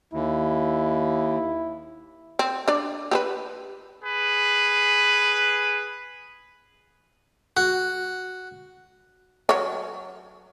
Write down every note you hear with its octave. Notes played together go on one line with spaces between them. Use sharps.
D#2 E4
C4
D4 D5
G4 G#4 B4
G#4 B4
F#4
F#3 C#5